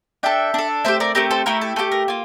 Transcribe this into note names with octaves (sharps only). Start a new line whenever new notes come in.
D4 A4 E5 G5
D4 A4
A3 C4 G4 C5 E5
A#4 D5
A3 C4 G4 A#4
A4 C5
A3 E4 G4 A#4
A4
A3 E4 G4 A4
A#4
A#3 F4